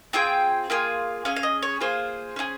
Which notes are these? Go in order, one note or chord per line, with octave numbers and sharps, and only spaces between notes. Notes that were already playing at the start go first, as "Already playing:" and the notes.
C4 F4 G#4 G5
A#3 F4 G#4
C#4 G#4 F5
F5
D#5
C#5
A#3 F4 G#4 C5
C#4 F4 G#4